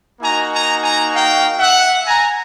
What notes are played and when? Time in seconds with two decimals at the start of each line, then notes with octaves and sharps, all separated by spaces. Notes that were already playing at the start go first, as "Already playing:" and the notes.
0.21 A#3 D#4 F#4 G#5 A#5
0.52 G#5 A#5
0.82 G#5 A#5
1.13 F5 G5
1.59 E5 F#5
2.06 G#5 A#5